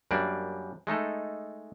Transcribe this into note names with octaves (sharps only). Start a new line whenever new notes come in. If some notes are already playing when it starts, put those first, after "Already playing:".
F#2 G3 A#3 D4 D5
G#3 A3 D#4 A4